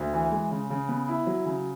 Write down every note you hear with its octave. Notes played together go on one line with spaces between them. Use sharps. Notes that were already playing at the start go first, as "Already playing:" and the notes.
Already playing: D2
E3
G#3
C#3
C#3
B3
E4
F#3
C#3